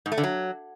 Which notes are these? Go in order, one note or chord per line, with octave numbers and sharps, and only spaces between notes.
G#2
A3
D3
F#3